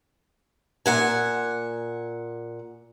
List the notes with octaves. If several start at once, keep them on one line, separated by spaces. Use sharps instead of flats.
A#2 F#5 G#5